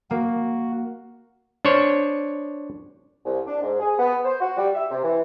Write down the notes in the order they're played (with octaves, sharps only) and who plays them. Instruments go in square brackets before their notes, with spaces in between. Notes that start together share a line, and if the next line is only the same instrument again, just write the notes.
[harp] A#3 [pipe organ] F#4
[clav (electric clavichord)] D4 C5 C#5
[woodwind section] C2
D4
G#2
G#4
B3
C5
F#4
G3
E5
C3
E3